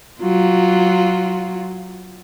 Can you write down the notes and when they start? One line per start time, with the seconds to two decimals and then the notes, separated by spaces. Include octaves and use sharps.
0.20 F#3 F4